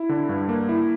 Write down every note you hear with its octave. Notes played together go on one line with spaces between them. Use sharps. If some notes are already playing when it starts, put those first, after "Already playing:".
Already playing: E4
D3
G2
A#3
E4